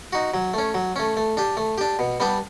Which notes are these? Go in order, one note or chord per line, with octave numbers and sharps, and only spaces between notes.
D#4 F#4
F#3
A3 C#4
F#3
A3 C#4
A3
D4 G4
A3
D4 G4
B2
G3 B3 D4 G4